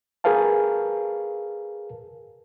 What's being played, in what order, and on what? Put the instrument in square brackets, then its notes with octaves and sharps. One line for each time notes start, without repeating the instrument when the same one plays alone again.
[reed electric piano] G#4 A#4 B4 F5 A5